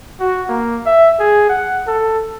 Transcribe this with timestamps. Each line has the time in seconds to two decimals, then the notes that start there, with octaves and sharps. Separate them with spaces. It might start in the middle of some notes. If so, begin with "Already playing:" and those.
0.20 F#4
0.49 A#3
0.86 E5
1.20 G#4
1.49 F#5
1.87 A4